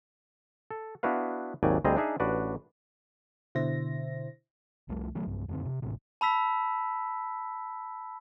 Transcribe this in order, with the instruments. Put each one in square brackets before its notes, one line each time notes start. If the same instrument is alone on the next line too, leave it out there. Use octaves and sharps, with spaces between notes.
[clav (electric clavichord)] A4
B3 D4 E4 F#4 B4 F5
G#1 D#2 F#3 D5 G5 G#5
D2 G3 C4 G#4 D#5 A#5
D4 D#4 G#4 E5
A1 D4 F#4 B4 D5
[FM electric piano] B2 D3 E4 C5 E5 A#6
[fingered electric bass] C2 F3 G3 A3
D#3 F#3 A3
B1 G2
E1 F#2 D3 C4
C3
G#1 A2 C3
[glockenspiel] A5 B5 E6 B6